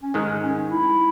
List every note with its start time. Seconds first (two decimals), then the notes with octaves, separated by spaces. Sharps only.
0.02 C#4
0.14 G#2 D#3 G#3 D#4
0.43 C#4
0.70 E4